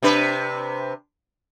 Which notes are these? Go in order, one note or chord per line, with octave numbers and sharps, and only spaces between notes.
C3 D4 B4